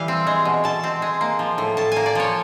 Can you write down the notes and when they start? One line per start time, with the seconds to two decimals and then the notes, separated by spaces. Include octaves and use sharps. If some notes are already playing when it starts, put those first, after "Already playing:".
Already playing: E3 G3 F5
0.08 C4
0.27 G#3
0.45 B2
0.64 B2 A5
0.84 C4
1.02 G#3
1.21 A#3
1.39 F3
1.58 A2
1.77 A2 A5
1.92 A#3 G#5
2.06 D5
2.15 F3 C#5